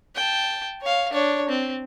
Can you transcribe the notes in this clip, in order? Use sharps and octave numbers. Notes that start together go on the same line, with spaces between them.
G5 A5
C#5 F5
D4 C#5
C4